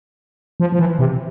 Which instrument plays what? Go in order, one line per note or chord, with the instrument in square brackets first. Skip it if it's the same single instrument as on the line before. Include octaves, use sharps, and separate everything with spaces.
[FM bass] F3
F3
E3
C3